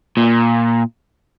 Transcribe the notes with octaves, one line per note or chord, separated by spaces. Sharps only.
A#2